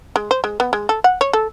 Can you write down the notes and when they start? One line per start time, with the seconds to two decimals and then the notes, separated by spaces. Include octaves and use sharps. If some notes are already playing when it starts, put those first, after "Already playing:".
0.16 G#3
0.31 C5
0.44 G#3
0.60 B3
0.73 G#3
0.89 A4
1.04 F#5
1.21 C#5
1.33 A4